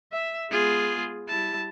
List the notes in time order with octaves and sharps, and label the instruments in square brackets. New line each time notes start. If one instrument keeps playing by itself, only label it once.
[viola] E5
[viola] G#3 B3 [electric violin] F4 G#4
[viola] G3 E4 [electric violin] A5